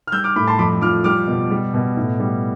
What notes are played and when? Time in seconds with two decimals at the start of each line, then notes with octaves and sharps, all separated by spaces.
0.07 F6
0.12 G3 E6 G6
0.24 D6 F6
0.36 A2 B5 D6
0.47 A5 C6
0.59 F2 B5 D6
0.81 F3 D6 F6
1.04 G3 D6 F6
1.27 B2
1.50 G3
1.74 B2
1.97 A2
2.20 G3